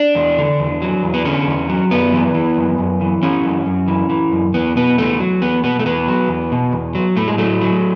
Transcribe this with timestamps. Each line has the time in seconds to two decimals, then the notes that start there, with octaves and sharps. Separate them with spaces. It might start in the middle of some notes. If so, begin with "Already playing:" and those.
Already playing: D4
0.15 E2
0.38 D3
0.60 E2
0.82 F#3
1.03 E2
1.14 B3
1.25 D3 C#4
1.47 E2
1.69 F#3
1.91 F#2 B3
2.13 E3
2.34 E3
2.57 F#2
2.78 F#2
3.01 E3
3.23 E3 C#4
3.45 F#2
3.66 F#2
3.88 E3
4.10 E3
4.32 F#2
4.54 E2 B3
4.76 B2 B3
4.98 E2 A3
5.19 F#3
5.41 E2 B3
5.64 B2 B3
5.79 A3
5.85 E2 B3
6.07 F#3
6.29 E2
6.52 B2
6.73 E2
6.95 F#3
7.16 A2 A3
7.28 G#3
7.38 F#3 A3
7.61 F#3